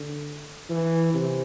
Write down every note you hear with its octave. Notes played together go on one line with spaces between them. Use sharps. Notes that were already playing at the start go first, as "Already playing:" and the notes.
Already playing: D3
E3
C3